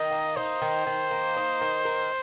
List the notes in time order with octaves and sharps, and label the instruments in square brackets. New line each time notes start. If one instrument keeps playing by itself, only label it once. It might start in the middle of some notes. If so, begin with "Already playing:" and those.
Already playing: [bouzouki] D#3 [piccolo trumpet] D#5
[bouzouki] A#3
[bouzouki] D#4 [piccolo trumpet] C5
[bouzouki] D#3
D#3
A#3
D#4
D#3
A#4